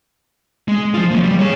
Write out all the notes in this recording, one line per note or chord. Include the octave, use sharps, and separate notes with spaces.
G#3
F3 F4
F#3 A#3
G3
G#4 C#5